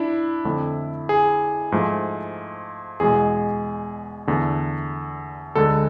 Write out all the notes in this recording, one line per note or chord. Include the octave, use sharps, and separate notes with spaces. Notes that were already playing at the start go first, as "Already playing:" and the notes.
Already playing: D4 E4
F2 D3 A3
G#4
G#2 F3 A3
E2 B2 G#3 G#4
E2 D3 A3
D2 D3 G#3 A4